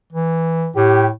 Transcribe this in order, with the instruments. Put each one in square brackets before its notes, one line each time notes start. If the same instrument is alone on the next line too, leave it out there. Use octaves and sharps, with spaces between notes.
[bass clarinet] E3
[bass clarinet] A2 [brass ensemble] G4